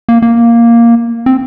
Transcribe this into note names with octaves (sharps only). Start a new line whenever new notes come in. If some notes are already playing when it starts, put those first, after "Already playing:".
A#3
A#3
C4